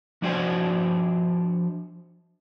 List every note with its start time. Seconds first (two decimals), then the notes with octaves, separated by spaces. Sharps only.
0.22 F3 D4 F#4 C5 D5 G#5